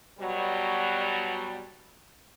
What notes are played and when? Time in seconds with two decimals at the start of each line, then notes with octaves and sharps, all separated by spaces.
0.20 B2 F#3 G3